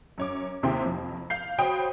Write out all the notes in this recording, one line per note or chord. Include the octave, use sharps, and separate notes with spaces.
F#2 C#5 D6
D#2 C3 C4 E4 G5
F2
F5 G6 C7
F#4 C5 C#5 G5 B5 D#6